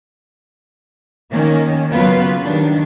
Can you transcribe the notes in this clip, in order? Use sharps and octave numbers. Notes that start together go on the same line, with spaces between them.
D#3 A#3 C#4
C#3 F#3 A#3 B3 F4 B4
D#3 G3 D4